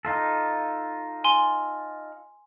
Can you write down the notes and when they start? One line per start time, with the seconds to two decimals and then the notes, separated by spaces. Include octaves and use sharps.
0.05 D#4 F4 A4
1.24 G#5 C6